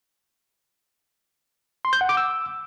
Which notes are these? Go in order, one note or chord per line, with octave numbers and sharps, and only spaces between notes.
C6
G6
F#5
D6
E6